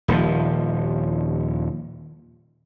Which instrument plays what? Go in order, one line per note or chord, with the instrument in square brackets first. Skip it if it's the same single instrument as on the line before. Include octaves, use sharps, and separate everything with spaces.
[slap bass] D#1 D#2 F3